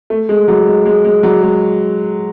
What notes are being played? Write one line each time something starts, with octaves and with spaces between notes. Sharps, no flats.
A3
G#3
F#3
G#3
G#3
G#3
F#3
G#3